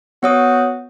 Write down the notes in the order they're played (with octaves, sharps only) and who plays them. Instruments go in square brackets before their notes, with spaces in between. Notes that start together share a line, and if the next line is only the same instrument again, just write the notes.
[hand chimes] B3 C#5 D#6 [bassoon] F#4